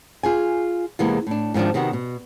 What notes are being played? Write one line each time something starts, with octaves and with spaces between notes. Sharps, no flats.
F4 G#4 G#5
E2 C3 E3 G#3 A#3 B3
A2 D4
G#2 D#3 F3 C4 D4
C3 D#3 B3 C4 F#4
B2